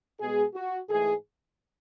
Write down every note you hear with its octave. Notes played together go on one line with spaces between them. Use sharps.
B2 G#3 B3 G#4
F#4
G#2 E3 A3 G#4